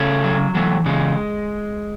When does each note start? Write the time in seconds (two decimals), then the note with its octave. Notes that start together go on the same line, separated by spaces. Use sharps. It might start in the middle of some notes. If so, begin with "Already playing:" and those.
Already playing: C#3 A3 C#4
0.24 F#3
0.55 E3 F#3 A3
0.86 C#3 G#3